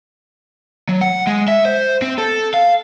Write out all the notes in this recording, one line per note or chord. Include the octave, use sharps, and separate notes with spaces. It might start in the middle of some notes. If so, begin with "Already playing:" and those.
F#3
F#5
G#3
E5
C5
C4
A4
F5